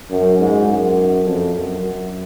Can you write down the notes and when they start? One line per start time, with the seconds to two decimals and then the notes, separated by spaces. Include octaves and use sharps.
0.11 F#2
0.39 G#2
0.67 F#2
1.24 F2
1.54 F#2
1.82 F#2